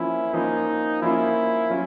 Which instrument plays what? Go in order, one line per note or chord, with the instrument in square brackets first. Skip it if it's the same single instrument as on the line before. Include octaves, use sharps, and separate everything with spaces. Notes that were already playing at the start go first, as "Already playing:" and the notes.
Already playing: [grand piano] F3 A#3 C#4 F4 [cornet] E4
[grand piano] F3 A#3 C#4 F4 [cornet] D#4
[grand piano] F3 A#3 C#4 F4 [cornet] E4
[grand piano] F#3 A#3 C#4 F4